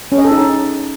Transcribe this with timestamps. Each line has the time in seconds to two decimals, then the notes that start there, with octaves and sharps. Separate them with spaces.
0.12 C#4
0.18 D#5
0.25 A4
0.31 D#4